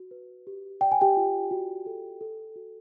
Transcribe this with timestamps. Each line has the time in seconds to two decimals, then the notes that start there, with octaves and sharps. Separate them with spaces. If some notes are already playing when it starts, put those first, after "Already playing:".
Already playing: F#4
0.11 B4
0.47 G4
0.81 D5 G5
0.92 G#5
1.01 G4 G5
1.17 F4
1.51 F#4
1.86 A4
2.21 A4
2.56 F#4